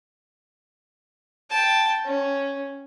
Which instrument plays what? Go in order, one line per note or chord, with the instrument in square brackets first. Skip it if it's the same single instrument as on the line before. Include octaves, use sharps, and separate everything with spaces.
[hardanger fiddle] G5 A5
C#4